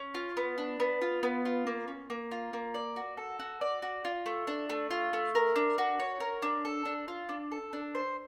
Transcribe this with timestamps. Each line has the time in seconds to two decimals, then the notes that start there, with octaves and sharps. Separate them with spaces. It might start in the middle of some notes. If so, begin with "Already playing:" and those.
Already playing: C#4
0.15 F4
0.37 B3
0.58 D4
0.80 B3
1.01 F4
1.23 B3
1.45 F4
1.67 A#3
1.88 C#4
2.10 A#3
2.31 F4
2.53 A#3
2.74 D5
2.96 F#4
3.17 A4
3.39 F#4
3.61 D5
3.82 F#4
4.05 F4
4.26 A3
4.47 D4
4.70 A3
4.91 F4
5.13 A3
5.35 A#4
5.56 D4
5.78 F#4
6.00 C#5
6.20 A#4
6.42 D4
6.65 A4
6.85 D4
7.08 F4
7.29 D4
7.51 A4
7.73 D4
7.95 C5